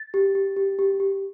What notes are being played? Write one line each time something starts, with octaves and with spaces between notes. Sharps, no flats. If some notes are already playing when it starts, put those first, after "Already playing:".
Already playing: A6
G4
G4
G4
G4
G4